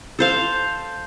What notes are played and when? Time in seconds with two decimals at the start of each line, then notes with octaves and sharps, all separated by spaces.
0.19 A4 C5 F5